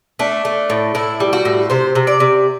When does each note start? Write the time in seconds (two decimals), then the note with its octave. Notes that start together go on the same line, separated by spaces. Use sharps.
0.19 A3 D4
0.45 A3
0.70 A2
0.95 A2 E4
1.20 G3
1.33 F#4
1.45 A2
1.70 C3 C5
1.95 C3
2.07 D5
2.20 C3